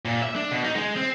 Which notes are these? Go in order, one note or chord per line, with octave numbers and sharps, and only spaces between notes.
A#2
E5
D4
B2
D#4
G#3
C4